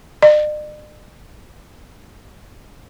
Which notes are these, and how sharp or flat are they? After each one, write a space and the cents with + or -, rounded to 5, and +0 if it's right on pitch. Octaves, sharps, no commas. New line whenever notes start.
D5 +45